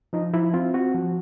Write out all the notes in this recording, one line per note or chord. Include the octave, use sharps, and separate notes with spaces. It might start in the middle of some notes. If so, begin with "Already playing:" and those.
F3 D#4
F3 E4
C4 F4
C4 F#4
F3